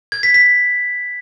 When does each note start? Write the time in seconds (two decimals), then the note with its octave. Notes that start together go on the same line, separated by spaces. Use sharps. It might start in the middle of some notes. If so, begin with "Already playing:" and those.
0.12 G#6
0.23 B6
0.34 B6